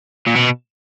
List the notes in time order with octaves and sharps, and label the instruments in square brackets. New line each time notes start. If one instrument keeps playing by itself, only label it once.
[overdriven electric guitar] A#2
B2